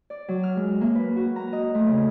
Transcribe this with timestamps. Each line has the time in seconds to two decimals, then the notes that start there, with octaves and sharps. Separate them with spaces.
0.10 D5
0.28 F#3
0.43 F6
0.57 G#3
0.81 A#3
0.95 B4
1.16 F#4
1.36 A#5
1.53 D#5
1.75 A3
1.88 C#3